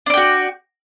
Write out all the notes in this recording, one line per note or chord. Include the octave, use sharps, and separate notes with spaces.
D4 F#4 D5 G5